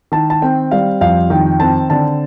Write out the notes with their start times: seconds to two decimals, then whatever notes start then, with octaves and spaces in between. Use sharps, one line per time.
0.12 D#3 A5
0.30 A5
0.42 C4 G5
0.71 G3 F5
1.01 F2 F5
1.30 D#3 G5
1.60 C4 A5
1.90 D3 A5